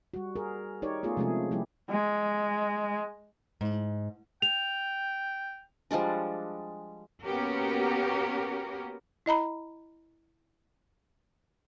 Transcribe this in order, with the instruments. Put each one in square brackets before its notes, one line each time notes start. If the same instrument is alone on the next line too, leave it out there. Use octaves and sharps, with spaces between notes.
[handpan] G3 F#4
G#4 A#4
D#4 G4 A#4 C#5 D5
A3 B3 F4 G#4
C3 F3 G#3 A3 C#4 G#4
F3 G3 A#3 E4 G4
[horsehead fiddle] G#3
[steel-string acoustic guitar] G#2
[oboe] G5 [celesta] F7
[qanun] F3 G3 G#3 D4
[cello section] A#3 B3 C#4 F#4 G4 A#4
[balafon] E4 D#5 A#5 B5